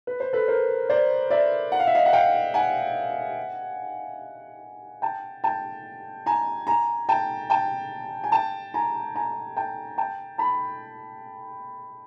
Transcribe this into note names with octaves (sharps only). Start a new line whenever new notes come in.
B4
C5
A4 B4
A#4 C5
C5 D5
D5 E5
F#5
F5
E5
D#5 F5
F#5
F5 G5
F#5 G#5
G5 A5
G5 A5
G#5 A#5
G#5 A#5
G5 A5
G5 A5
G#5
G5 A5
G#5 A#5
G#5 A#5
G5 A5
G5 A5
A5 B5